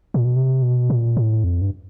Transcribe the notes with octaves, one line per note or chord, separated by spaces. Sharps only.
A#2
B2
C3
B2
A#2
A2
F2
G2